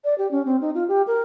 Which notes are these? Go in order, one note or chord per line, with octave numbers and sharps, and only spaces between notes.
D5
G4
C#4
C4
D#4
F4
G4
A#4